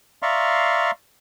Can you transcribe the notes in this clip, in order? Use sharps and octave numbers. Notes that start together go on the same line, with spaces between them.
D5 E5 F5 A#5 C6 C#6